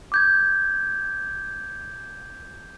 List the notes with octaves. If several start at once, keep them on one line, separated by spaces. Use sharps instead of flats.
D6 G6 G#6